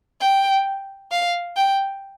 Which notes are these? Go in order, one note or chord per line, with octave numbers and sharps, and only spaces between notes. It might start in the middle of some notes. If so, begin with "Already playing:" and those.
G5
F5
G5